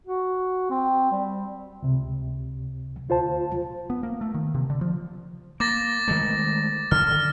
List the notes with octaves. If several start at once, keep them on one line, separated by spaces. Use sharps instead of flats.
F#4
C4
G3
C#2 C3
D2 F4 C5 A5
B3
A#3
A3
D#3
C3
D3
F3
A#3 D6 A6 A#6
D#3 G#3 A3
D3 D#3 F6